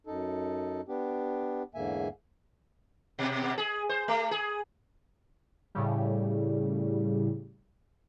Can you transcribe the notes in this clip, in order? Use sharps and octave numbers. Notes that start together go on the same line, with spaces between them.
F#2 D#4 A4
B3 D4 G4
E2 G#2 D3 A#3 E5 G#5
B2
B2
G#4
C5
A3
G#4
A2 C#3 G3